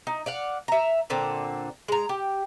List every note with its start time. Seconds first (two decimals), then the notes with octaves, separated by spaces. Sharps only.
0.07 D#4
0.26 D5 F5 F#5
0.68 E5 A#5
1.10 A#2 D3 C4
1.88 G#3 A#5
2.09 G4